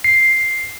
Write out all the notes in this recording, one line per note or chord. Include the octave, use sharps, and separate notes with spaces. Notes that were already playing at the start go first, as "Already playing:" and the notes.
C7